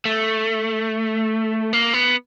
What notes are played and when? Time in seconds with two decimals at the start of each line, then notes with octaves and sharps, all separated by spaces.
0.05 A3
1.73 A#3
1.94 B3